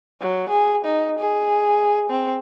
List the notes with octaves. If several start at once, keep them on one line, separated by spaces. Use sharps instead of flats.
F#3
G#4
D#4
G#4
C4